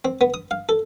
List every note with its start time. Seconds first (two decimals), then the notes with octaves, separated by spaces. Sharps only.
0.05 C4
0.21 B3
0.34 D#6
0.51 F5
0.69 A4